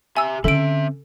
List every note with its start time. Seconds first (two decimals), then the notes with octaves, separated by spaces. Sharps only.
0.17 G4 E5 G#5 E6
0.44 D3 C4 C#4 A4 E5 D7